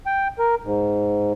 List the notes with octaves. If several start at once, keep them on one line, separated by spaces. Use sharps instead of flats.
G5
A#4
G#2